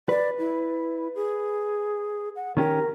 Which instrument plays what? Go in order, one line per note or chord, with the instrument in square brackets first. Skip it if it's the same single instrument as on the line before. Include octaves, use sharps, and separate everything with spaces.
[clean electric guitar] B4 [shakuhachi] D5
[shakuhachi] E4
G#4
F#5
[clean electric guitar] D#3 C#4 G4 [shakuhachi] A#4